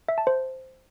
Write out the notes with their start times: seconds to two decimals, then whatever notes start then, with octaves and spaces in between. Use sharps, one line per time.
0.09 E5
0.18 A5
0.27 C5